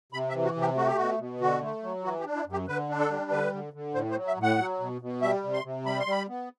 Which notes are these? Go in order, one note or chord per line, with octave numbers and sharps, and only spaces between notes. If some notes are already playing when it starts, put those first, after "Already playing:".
C3 B5
E5
E3
F#4
C3
G4
A3 F#4
G4
B2 F#4
B2
D3 F#4
A3
F#3
E3 F#4
G4
D4
E4
F#2
G4
D3 B4
D4
A4
G3
D3 B4
D3
D3
A2 C5
C5
F#3
E5
A2
F#5
F#3
B2
B2
G3 E5
C3
C6
C3
G3 B5
C6
G3 B5
B3